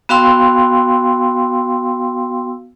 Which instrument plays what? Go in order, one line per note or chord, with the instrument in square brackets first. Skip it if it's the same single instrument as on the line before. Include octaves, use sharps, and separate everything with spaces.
[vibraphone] B3 F#4 F5 G5 C6 E6